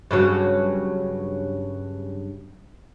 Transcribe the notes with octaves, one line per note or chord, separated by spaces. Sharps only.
G2 C#3 F#3